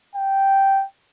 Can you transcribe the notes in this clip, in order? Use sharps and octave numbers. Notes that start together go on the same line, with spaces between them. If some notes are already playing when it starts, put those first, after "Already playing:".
G5